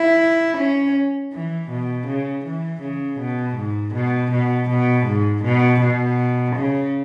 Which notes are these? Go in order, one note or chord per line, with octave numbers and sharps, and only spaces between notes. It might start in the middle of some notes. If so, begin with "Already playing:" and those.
Already playing: E4
C#4
E3
B2
C#3
E3
C#3
B2
G#2
B2
B2
B2
G#2
B2
B2
C#3